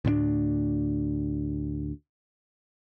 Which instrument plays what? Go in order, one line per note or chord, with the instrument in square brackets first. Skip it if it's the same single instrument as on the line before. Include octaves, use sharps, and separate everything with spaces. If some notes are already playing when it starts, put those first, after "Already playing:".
[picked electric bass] D2 A2 B3 D4